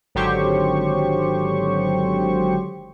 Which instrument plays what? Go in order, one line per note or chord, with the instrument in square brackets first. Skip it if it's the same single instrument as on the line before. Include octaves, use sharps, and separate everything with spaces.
[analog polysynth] G#1 D3 F#3 G4 C5 C#6